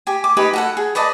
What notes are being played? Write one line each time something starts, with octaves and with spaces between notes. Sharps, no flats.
G4 G#5
D6
D#4 G4 B4 G#5
F#4 A4 F#5
G#4
B4 D5 D#5 A5